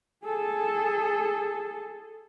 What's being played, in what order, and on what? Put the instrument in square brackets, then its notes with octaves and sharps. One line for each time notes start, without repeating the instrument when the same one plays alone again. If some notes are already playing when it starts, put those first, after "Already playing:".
[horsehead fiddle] G#4 A4